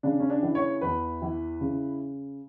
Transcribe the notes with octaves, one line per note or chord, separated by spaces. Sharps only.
C#3 D4
C#4
D4
E3
C#5
E2 B4
E3
C#3